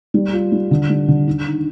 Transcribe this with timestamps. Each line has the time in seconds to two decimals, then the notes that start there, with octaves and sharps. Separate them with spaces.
0.14 G3
0.33 F4
0.52 G3
0.71 D3
0.90 G3
1.08 D3
1.27 D4
1.45 D#3